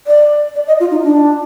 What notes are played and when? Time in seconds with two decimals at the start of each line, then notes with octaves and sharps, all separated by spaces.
0.07 D5
0.55 D5
0.67 D#5
0.80 F4
0.91 D#4
1.03 D4